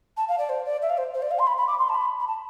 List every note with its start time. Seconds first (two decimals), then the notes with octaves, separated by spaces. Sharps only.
0.17 A5
0.28 F5
0.38 D5
0.49 C5
0.65 D5
0.82 E5
0.89 F5
0.97 C5
1.14 C5
1.22 D5
1.31 F5
1.39 C6
1.47 B5
1.57 B5
1.67 D6
1.78 C6
1.89 A5
1.94 B5
2.19 B5
2.27 A5